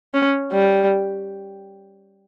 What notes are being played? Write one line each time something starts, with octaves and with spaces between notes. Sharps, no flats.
C#4
G3